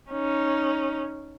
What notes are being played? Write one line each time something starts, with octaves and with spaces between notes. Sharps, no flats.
C#4 D#4